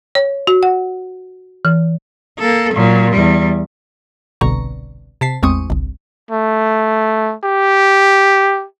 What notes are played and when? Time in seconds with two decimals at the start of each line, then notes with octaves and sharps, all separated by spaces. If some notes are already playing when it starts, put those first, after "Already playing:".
0.15 C#5
0.47 F#4
0.63 F#5
1.65 E3
2.39 A#3 A4
2.73 A#2 F#3
3.12 E2 G3
4.41 G1 C2 B2 D3 A#5 C#6
5.21 C3 A5 B6 C7
5.43 A1 E2 G#3 C4 C#6 D#6
5.70 G1 C2
6.31 A3
7.44 G4